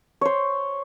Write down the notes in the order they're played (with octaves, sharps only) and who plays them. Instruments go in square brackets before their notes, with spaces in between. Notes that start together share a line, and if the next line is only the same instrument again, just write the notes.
[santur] C5 C#5